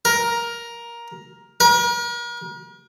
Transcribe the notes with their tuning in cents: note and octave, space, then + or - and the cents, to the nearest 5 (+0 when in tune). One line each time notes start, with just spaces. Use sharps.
A#4 +10
A#4 +40